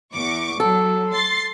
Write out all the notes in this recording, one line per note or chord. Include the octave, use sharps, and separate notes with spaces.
E2 C#6 D6
F#3 A4
C6 A6 C7